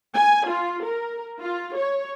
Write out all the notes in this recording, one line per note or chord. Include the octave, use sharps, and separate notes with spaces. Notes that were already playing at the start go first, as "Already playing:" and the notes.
G#5
F4
A#4
F4
C#5